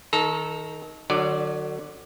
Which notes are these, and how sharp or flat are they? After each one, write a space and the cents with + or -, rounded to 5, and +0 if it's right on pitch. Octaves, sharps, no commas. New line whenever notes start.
D#3 +15 A4 -20 A#5 +0
D3 +35 F#3 +0 D5 +0